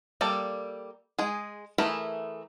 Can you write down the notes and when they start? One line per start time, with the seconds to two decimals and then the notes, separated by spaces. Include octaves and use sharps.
0.21 G3 A#3 A4 D5
1.19 G#3 G#4
1.78 E3 A3 G#4 A#4 B5